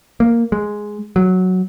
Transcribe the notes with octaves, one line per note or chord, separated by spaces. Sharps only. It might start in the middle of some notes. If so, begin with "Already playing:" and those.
A#3
G#3
F#3